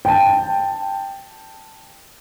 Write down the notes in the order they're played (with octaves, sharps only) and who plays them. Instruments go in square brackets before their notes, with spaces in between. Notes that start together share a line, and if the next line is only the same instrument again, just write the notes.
[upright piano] G5 A5